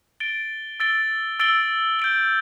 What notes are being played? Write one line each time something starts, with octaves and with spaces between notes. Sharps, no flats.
A6 D7 G7
E6 A6 D7 G7
E6 A6 D7 G7
G6 D7 G7